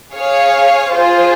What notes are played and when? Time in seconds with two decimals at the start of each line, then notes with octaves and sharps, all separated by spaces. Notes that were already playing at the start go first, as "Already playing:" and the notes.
0.14 G#4 C#5 F5
0.92 F4 G#4 C5